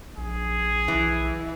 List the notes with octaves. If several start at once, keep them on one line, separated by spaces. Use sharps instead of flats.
A#1 G#4
B1 E3